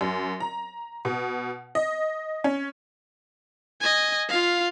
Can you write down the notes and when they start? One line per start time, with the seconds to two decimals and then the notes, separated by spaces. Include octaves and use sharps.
0.01 F#2
0.40 A#5
1.05 B2
1.75 D#5
2.44 C#4
3.81 D#5 G#5
4.29 F4 F5